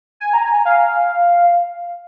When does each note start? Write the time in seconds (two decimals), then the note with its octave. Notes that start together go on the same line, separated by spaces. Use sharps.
0.20 G#5
0.33 A#5
0.45 G#5
0.65 F5